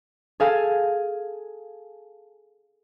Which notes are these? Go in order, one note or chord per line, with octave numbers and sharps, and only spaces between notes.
G#4 A4 F5 G#5 A5